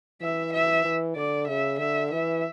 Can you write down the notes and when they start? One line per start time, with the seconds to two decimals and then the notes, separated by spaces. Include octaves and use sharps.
0.22 E3 E5
0.53 E5
0.84 E3
1.16 D3 D5
1.48 C#3 E5
1.79 D3 E5
2.11 E3 E5